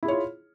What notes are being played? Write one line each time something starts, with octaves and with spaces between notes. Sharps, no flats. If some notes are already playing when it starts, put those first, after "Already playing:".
E4 F4 G#4 C#5